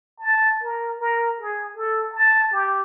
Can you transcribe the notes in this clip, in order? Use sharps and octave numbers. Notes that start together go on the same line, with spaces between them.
A5
A#4
A#4
G#4
A4
A5
G4